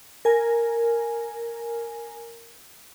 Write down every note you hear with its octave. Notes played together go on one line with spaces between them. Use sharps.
A#4 G#5